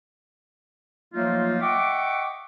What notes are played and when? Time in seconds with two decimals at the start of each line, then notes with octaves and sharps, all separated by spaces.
1.14 F3 F#3 A3 A#3 D#4 F4
1.60 D#5 E5 F#5 G5 C#6 D6